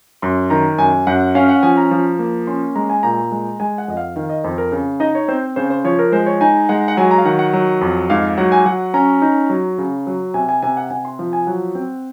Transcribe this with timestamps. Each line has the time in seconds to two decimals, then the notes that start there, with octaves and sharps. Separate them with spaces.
0.22 F#2 C6
0.50 D#3 A#5
0.78 F#2 G#5
1.07 F#2 F#5
1.35 C#4 F5
1.49 F#5
1.63 F3 G#5
1.77 A#5
1.91 F3
2.19 A#3
2.47 C#4 C6
2.75 G#3 A#5
2.90 G#5
3.03 A#2 A#5
3.31 G#3
3.60 G#3 G#5
3.78 F#5
3.88 F2 D#5
3.97 F5
4.16 D#3 F5
4.30 D#5
4.44 F2 C5
4.58 A#4
4.72 C#3
5.00 D#4 D#5
5.15 C#5
5.28 C4 C5
5.56 C#3 C5
5.70 C5
5.84 F3 C#5
5.99 A#4
6.12 G#3 C5
6.26 C#5
6.41 D#4 G#5
6.69 G#3 F#5
6.88 F#5
6.97 F#3 G#5
7.11 A#5
7.18 F5
7.25 D#3 F#5
7.39 F#5
7.53 F#3
7.81 F2
8.10 G#2 F5
8.38 F#3 F#5
8.52 G#5
8.66 F#3 F#5
8.94 C#4 A#5
9.22 D#4
9.50 F#3
9.78 C#3
10.07 F#3
10.34 C3 G#5
10.49 G#5
10.63 C3 G#5
10.77 F#5
10.90 C3 G#5
11.05 C6
11.19 F3
11.33 G#5
11.47 F#3 F#5
11.75 C4